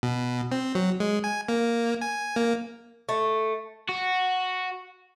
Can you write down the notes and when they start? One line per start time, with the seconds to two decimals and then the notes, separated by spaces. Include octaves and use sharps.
0.03 B2
0.52 C4
0.75 F#3
1.00 G#3
1.24 G#5
1.48 A#3
2.02 G#5
2.36 A#3
3.09 A3
3.89 F#4